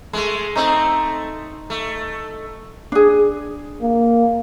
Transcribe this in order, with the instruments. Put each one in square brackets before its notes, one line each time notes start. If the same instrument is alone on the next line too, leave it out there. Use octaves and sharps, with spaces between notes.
[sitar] G#3 A3 [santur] C6
[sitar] A3 C4 [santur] D#4 D#5
[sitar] A3
[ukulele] D4 G#4
[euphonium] A#3